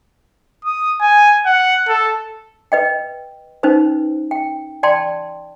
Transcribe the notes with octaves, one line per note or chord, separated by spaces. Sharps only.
D#6
G#5
F#5
A4
B4 D#5 G5
C#4 D#4 B4 C5
G5
D5 G5 A5 C6